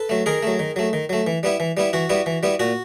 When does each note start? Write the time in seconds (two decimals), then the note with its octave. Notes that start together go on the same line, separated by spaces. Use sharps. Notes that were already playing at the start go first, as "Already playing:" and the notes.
Already playing: A4 B4
0.09 F#3 A3
0.26 D#3 G#4 A#4
0.43 F#3 A3
0.59 D#3
0.76 F#3 A3
0.93 D#3
1.09 F#3 A3
1.27 E3
1.43 G3 B3 E4
1.60 E3
1.77 G3 B3 E4
1.93 E3 F#4
2.10 G3 B3 E4
2.26 E3
2.43 G3 B3 E4
2.60 A#2 F#4